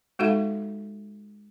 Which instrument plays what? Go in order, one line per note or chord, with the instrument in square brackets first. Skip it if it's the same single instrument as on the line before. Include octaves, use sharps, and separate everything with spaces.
[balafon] G#3 D#4 F#4 A4 E5 F5